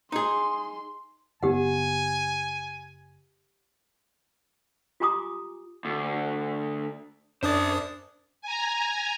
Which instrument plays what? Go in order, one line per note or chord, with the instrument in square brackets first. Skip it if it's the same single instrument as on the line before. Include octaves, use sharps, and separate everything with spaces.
[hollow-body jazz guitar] D#4 G#4 [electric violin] C6
[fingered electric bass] F#1 B3 [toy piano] G4 F#5 [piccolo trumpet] G#5
[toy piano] F4 G4 G#5 A#5 D6 D#6
[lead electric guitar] D2
[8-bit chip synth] F#2 D4 D#6 [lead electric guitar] C5 D5
[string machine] G#5 A#5